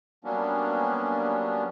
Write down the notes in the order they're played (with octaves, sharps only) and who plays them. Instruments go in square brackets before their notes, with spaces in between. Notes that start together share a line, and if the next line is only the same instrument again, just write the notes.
[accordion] F#3 G3 A#3 B3 C#4 D4